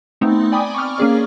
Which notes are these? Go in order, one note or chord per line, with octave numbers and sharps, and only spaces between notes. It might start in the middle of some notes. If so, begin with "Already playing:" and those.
A3 B3 C4 D#4
D5 G5 G#5 B5 D6 D#6
C#6 D6 F6
A#3 C#4 G#4 D5